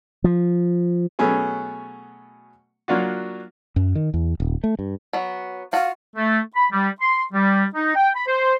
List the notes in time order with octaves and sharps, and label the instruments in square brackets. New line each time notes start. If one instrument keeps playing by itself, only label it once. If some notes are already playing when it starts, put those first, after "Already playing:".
[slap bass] F3
[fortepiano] B2 F#3 A3 B3 C#4 G#4
F#3 A#3 D4 F4 F#4
[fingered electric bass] F#2
D#3
E2
D#1
A3
G2
[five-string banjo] F#3 B3
[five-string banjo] F4 F#4 [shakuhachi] F5
[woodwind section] A3
B5
G3
C6
G3
D#4
G5
B5
C5